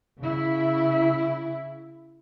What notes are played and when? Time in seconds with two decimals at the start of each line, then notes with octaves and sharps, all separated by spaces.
0.19 C#3 E4